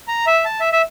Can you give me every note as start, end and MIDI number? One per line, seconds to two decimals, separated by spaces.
0.08 0.25 82
0.27 0.45 76
0.45 0.60 81
0.60 0.69 76
0.72 0.82 76